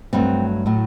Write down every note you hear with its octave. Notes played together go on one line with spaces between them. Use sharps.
G2 F#3 A3 C4
A2 F#3 A3